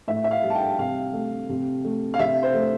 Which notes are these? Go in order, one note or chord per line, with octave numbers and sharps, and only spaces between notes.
A2 E5
E5
F5
G3
A5
G5
C3 F5
A3
C3
A3
F5
C3 E5
C5
A3